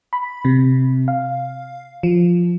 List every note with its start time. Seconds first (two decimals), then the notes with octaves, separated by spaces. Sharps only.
0.13 B5
0.45 C3
1.08 F5
2.03 F3